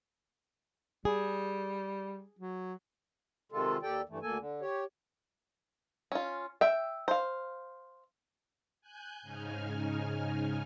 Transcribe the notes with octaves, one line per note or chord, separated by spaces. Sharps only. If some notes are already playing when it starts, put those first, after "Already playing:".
G3 G#4
F#3
C3 D#3 G#3 F4 A4
D#2 G4 A4 D5 G5
G2 E3 A3
D2 A#3 A4 G#5
D3
G4 C#5
C#4 F4
E5 G5
C5 F5
G#5 F#6 G6
G#2 C#3 D#4 G#5 F6